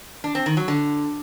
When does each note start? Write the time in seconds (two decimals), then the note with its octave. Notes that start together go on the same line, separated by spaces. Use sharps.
0.24 D4
0.35 C4
0.46 D#3
0.57 F#3
0.68 D3